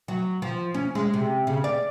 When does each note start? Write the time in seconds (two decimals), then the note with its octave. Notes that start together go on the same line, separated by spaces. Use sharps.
0.08 F#3
0.42 F3
0.74 C#4
0.95 G#3
1.14 C3
1.47 C#3
1.64 D5